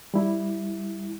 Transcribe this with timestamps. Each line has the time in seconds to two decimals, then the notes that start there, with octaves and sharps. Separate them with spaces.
0.14 G3 E4